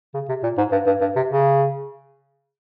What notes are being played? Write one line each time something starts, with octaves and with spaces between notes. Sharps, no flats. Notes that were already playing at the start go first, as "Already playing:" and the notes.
C#3
C3
A#2
G#2
G2
G2
G2
C3
C#3